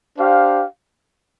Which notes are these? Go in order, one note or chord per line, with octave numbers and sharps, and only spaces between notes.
D4 G4 C5 F5